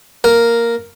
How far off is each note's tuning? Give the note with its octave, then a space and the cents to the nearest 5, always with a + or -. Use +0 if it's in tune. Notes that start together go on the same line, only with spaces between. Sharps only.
A#3 +0 A#4 +0